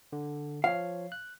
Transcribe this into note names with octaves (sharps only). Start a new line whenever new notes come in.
D3
F3 C#5 F5
F#6